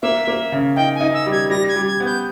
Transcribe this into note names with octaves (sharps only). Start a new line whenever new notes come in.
A#3 E5
A#3
C#3
D#4 G5
G#5
D#4
E6
G3
G#6
G3 A#6
G#6
G3
G#6
B3
G6